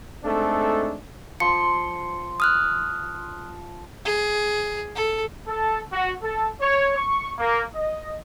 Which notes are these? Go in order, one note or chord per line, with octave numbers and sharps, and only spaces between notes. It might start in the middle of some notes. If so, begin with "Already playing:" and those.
G#3 A3 C4 D4 D#4 A4
F3 C6 C#7
D#6 F6 F#6
G#4
A4
A4
F#4
A4
C#5
C#6
A#3
D#5